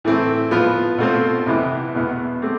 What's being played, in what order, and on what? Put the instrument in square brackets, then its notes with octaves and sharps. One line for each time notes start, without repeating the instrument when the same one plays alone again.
[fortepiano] A2 E3 A3 C4 E4
F3 B3 F4
B2 A3 C4 F4 C5
F2 C3 E3 B3 E4
E2 B2 B3 E4
A3 C4 G4